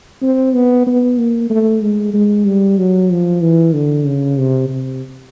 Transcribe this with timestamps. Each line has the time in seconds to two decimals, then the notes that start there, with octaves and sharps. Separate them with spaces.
0.22 C4
0.54 B3
0.87 B3
1.18 A#3
1.50 A3
1.82 G#3
2.14 G#3
2.45 G3
2.78 F#3
3.10 F3
3.41 E3
3.74 D3
4.06 C#3
4.38 C3
4.69 C3